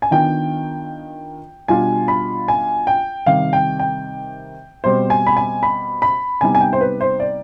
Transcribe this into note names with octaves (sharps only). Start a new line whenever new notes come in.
G#5
D#3 B3 D4 F4 G5
B2 G3 D4 F4 G#5
B5
G#5
G5
C3 D#3 G3 F5
G5
G5
B2 G3 C4 C5
G#5
B5
G#5
B5
B5
C3 G3 B3 D#4 G#5
G#5
G5
C5
B4
C5
D5